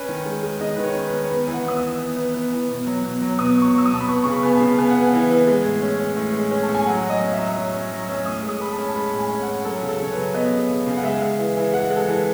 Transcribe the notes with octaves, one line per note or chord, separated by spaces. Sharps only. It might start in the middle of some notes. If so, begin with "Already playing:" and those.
Already playing: C#4 B4
D#3
G#3
G#3
D#3 D#5
D#3 B4
C#5
C#4
B4
D#3
C#5
B3 B4
E3
F#5
B3 D#6
E6
E3
B3
B3
B3
E3
B2
F#3
B2
F#3
B2 D#6
F#3
C#6
F#3 E6
D#6
B2 A5
B5
B3 C#6
C#3 C#6
B5
B3 G#5
A5
C#3
B3 G#5
F#5
B3
G#5
E3
E3
G#3
A2
C#4
C#4
A2
G#3
C#4
A5
A2
G#5
F#3 F#5
F#3
D#5
C#4
E5
F#3
F#3
C#4
F#3
C#4 E6
A2 D#6
G#3
D#6
G#3 B5
A5
C#4
A5
G#3 B5
A2
G#5
C#4
F#5
C#4
F#3 A4
C#3
A4
C#3 C#5
B4
F#3
B3 D#5
C#3
C#3
C#3
F#5
G#3 E5
G#3
E3
E3
G#3 F#5
G#3
A4
E3